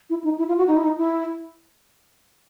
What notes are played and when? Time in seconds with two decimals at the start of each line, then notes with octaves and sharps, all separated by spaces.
0.10 E4
0.24 D#4
0.38 E4
0.48 F4
0.58 F#4
0.68 D#4
0.76 E4
0.84 D#4
0.98 E4